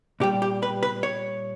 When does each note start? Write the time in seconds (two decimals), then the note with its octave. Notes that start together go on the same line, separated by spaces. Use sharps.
0.20 A#2 G3 G4
0.42 G4
0.63 B4
0.83 B4
1.03 C#5